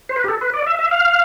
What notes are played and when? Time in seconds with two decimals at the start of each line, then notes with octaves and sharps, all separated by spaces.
0.09 C5
0.16 B4
0.24 G4
0.28 A4
0.41 B4
0.53 D5
0.66 E5
0.79 E5
0.91 F5